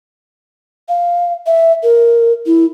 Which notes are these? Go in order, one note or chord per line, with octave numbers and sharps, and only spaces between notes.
F5
E5
A#4
E4